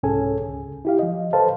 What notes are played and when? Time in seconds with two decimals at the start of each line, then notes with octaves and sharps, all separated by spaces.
0.03 C2 G#2 C#4 G#4 A4 G#5
0.48 C#2
0.85 E4 G4 F5
0.99 F3 D#5
1.33 A4 B4 C5 F5 A5